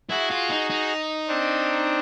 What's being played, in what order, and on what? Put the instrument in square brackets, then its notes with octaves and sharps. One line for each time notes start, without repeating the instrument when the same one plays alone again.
[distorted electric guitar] E4 [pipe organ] F#4 G#4
[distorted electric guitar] F4
D#4
D#4
[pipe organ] C4 D4